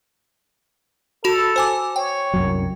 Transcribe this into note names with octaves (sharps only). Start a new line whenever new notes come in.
F#4 A4 B5 F7
C5 G#5 D6
C#5 G5
C2 F#2 F#3